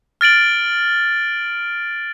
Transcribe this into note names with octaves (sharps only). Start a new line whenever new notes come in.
F6 A6 D7 F#7